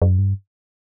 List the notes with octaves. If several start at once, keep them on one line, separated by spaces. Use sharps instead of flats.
F#2
G2